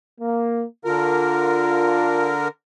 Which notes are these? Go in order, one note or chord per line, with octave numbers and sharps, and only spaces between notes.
A#3
D3 F4 A#4